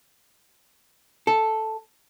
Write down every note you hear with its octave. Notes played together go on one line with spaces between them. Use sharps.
A4